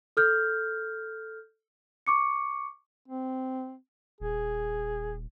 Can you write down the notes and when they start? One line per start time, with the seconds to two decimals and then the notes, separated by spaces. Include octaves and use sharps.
0.17 A4 F6 G6
2.07 C#6 D6 C#7
3.08 C4
4.20 D#1 G#4